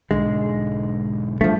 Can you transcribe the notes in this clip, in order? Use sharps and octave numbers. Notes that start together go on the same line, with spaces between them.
B1 G#2 D3 G#3
A1 F3 G3 A3 D4